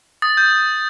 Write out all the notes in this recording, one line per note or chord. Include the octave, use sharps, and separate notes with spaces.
D#6 A6
G6